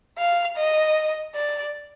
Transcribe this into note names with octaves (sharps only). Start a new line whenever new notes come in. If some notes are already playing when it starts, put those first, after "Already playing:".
F5
D#5
D5